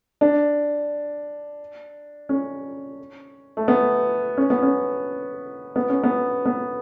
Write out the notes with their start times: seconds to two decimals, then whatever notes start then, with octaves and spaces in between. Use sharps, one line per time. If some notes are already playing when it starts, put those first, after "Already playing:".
0.21 D4
2.29 C#4
3.57 A3
3.68 B3
4.37 C#4
4.50 B3
4.63 C#4
5.76 B3
5.90 C#4
6.03 B3
6.45 B3